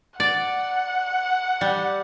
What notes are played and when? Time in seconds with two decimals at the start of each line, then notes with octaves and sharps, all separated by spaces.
0.20 D5 F#5
1.61 G3